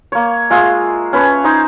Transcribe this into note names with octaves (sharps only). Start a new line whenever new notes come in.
A#3 C#5
G#3 F4 G#4 E5
C#4 B4 C#5 A5
D#4 C5 G#5